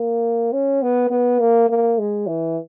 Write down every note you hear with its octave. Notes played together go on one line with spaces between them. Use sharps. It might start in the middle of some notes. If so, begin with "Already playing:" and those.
Already playing: A#3
C#4
B3
B3
A#3
A#3
G#3
E3